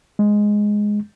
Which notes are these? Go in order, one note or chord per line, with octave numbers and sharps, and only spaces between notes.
G#3